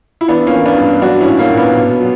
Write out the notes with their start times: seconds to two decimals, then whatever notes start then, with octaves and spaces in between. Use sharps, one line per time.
0.21 E4
0.28 E3 B3 D4
0.47 A#3 C#4
0.53 E3
0.66 B3 D4
0.78 G2
1.02 F#3 D4 F#4
1.21 C#4 E4
1.27 A#2
1.39 A#3 C#4
1.52 A#2
1.57 B3
1.76 B2
2.00 F#3